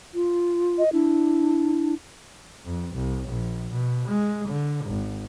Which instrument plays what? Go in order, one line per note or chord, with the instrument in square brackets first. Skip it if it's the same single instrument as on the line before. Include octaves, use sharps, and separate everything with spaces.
[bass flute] F4
[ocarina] D#5
[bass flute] D4 [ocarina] E4
[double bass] F2
C2
A#1
B2
G#3
D3
G#1